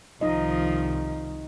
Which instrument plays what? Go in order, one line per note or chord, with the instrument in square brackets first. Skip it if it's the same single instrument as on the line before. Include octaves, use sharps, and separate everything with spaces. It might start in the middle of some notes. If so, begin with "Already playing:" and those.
[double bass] C2 D#3 [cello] F3 [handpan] D#4 D#5